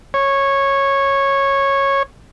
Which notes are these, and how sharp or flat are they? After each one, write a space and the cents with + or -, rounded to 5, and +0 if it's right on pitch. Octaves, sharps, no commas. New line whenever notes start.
C#5 -10